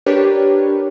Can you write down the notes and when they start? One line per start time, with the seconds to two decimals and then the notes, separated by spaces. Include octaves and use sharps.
0.06 D4 G4 A#4 B4 C#5